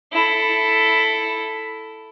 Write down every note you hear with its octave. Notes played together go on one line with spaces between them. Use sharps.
E4 A4